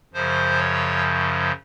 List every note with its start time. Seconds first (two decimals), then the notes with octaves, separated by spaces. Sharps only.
0.14 F#2 C#3 F3 C5
0.58 C#5